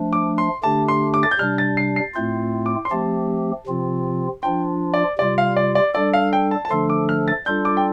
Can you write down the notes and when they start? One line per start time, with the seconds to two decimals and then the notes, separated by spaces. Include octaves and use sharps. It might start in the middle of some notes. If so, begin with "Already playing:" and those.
Already playing: F3 A3 D4
0.13 D6
0.38 C6
0.63 D3 A3 D4 G4 A5
0.88 C6
1.14 D6
1.23 A6
1.31 G6
1.39 C3 G3 D4 F6
1.58 A6
1.77 C7
1.96 C7
2.15 A2 A3 C4 F4 G6
2.66 D6
2.85 C6
2.91 F3 A3 C4 G4 A5
3.67 C3 F3 C4 F4
4.43 F3 D4 F4 G5
4.94 D5
5.19 C3 G3 F4 D5
5.38 F5
5.56 D5
5.75 D5
5.94 G3 D4 A4 D5
6.13 F5
6.33 G5
6.51 A5
6.65 A5
6.70 D3 F3 A3 D4 A4 C6
6.90 D6
7.09 F6
7.28 A6
7.46 G3 D4 F4 A4 G6
7.65 D6
7.77 G5